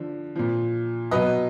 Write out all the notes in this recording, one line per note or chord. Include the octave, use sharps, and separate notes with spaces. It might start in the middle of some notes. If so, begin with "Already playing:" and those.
Already playing: D3 F3
A#2 F3
B2 F#3 B4 D#5